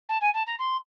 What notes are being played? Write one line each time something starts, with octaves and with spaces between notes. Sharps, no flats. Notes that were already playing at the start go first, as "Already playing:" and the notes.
A5
G#5
A5
A#5
C6